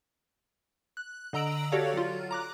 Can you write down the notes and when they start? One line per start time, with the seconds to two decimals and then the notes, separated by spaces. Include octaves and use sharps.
0.97 F#6
1.33 D3 D#5 A#5 E6 D7 F#7
1.72 F#4 G4 A4 C#5 D5 F5
1.94 F#3 F4
2.31 A#5 D6 F#6